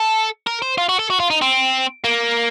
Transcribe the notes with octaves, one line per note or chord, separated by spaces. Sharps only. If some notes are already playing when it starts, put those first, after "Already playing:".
Already playing: A4
A#4
C5
F4
F#4
A4
F#4
F4
D#4
C4
A#3